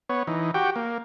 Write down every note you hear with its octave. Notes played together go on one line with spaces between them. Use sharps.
B3 C#5
E3 D#4
F#4 G4 G5
A#3